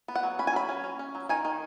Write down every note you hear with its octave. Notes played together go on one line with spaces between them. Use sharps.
B3
F#5
F#3
C#4 B5
G#5
F#3 B5
C#4
C#4
C#4
F#3
D#3 G#5
D#3